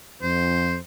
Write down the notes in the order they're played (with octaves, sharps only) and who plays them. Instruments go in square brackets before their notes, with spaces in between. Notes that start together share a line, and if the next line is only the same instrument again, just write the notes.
[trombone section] F2 [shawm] C5